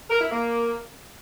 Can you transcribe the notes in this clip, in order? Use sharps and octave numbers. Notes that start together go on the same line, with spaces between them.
A#4
E4
A#3